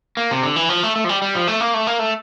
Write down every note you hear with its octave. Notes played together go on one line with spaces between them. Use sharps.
A#3
C3
D3
E3
F3
A3
A3
F3
G3
G3
F3
A3
A#3
A3
A#3
A3